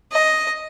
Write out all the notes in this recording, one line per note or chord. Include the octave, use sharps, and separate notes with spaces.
D#5